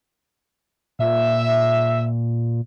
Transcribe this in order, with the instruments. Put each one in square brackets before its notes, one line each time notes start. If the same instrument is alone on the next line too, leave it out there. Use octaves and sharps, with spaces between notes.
[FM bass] A#2 [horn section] E5